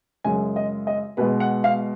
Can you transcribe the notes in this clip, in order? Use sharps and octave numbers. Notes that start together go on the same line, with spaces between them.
F#2 C#3 G#3 G#5
D#5
D#5
B2 G#3 B4
F#5
F5